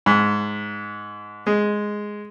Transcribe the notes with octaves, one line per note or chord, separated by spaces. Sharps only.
G#2
G#3